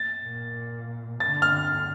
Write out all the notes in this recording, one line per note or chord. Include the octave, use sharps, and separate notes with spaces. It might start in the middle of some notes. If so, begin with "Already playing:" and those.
Already playing: A6
A#2
D3 A6
F6